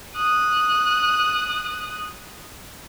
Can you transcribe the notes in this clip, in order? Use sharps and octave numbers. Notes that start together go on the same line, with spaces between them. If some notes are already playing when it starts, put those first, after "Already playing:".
D#6 F#6